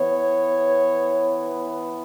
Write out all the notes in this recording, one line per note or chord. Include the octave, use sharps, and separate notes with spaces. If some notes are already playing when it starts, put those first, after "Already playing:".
Already playing: E3 B3 C#5